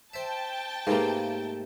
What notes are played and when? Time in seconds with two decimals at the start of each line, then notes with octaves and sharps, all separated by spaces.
0.14 C5 E5 G5 A5
0.87 G#2 C3 A3 A#3 G#4 B4 F5